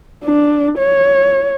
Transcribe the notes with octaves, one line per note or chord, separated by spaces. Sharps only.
D4
C#5